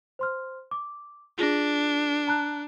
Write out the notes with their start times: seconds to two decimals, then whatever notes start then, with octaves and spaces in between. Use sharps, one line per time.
0.19 C5 C6 F6
0.71 D6
1.39 D4 F4 G#4 A#6
2.28 A5 A#5 F#6